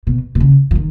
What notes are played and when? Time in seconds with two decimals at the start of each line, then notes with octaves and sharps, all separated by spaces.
0.07 B2
0.35 B2
0.40 C#3
0.71 E3
0.75 D#3